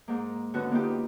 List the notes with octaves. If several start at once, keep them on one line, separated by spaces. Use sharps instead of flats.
G#2 A#3
D3 B3 C#4 F#4
A#3 B3 D#4 F4 G4